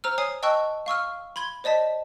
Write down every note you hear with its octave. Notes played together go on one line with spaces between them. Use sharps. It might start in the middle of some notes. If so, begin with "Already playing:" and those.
C5 A#5 E6 F6
C#5 G#5 D#6 C7
D#5 G5 A5 C#6 E6 F#6
F5 C#6 E6 F6
B5 C6 G#6 G7
C5 D5 D#5 A5 B6